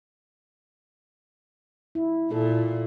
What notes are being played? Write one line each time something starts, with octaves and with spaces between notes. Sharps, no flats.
E4
A#2 E4 A4